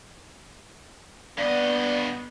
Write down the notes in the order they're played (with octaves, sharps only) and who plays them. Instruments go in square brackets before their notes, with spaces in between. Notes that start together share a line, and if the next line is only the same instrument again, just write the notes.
[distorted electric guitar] G2 D#5 [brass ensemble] B3 [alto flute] D5